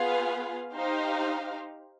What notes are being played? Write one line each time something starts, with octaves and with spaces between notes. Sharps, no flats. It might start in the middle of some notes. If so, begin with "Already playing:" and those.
Already playing: B3 F4 G#4 B4 F5
D#4 G4 C5 F5